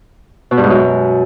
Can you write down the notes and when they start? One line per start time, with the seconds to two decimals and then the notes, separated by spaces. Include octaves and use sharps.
0.51 B2
0.57 G2
0.64 G#2
0.70 F#2